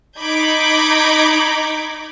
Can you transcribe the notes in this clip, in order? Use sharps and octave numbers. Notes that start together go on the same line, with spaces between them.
D#4 B5 D6 G6 G#6